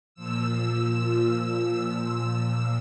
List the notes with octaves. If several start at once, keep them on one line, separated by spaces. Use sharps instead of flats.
A#2 F3 E6